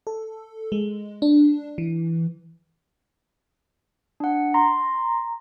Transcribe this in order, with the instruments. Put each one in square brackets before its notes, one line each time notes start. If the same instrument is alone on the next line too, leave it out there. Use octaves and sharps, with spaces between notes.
[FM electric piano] A4
G#3
D4
E3
[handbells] D4 F#5
[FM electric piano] A#5 [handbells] C6